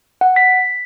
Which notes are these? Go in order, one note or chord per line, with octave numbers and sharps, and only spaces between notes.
F#5
B6